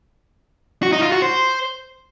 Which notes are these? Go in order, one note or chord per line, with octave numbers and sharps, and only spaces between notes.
F#4
D#4
F4
F#4
C5